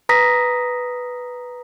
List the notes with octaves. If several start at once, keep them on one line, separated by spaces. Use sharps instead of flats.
B4 A#5 D#6 A#6 B6